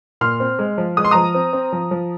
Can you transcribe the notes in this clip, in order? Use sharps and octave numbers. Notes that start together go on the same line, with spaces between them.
A#2 C6 F6
C4
G#3
F3
G#3 D#6
C6
F3 A#5 D#6
C4
C4
F3
F3